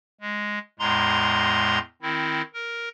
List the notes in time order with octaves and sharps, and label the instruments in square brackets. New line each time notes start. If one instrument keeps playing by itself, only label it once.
[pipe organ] G#3
E2 A2 G#3 A#5 C6
D#3 C4 E4
A#4